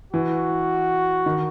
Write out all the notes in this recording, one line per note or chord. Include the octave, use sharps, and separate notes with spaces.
E3 F#4
D#3